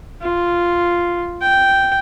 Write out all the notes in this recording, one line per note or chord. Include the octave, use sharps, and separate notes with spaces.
F4
G5